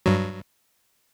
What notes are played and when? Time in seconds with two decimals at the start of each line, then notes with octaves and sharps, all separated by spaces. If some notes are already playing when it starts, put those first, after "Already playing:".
0.06 G2 F#3